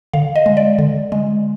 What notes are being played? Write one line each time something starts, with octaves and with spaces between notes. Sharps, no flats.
D3 F5
D#5
G#3
D5
D3
G#3